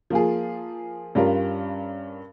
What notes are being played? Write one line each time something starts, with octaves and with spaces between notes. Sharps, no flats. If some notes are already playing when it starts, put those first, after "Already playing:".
F3 A#3 F4 G#4
G2 G3 C#4 F4 A#4